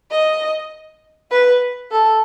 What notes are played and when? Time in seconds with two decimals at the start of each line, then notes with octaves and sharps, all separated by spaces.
0.12 D#5
1.31 B4
1.91 A4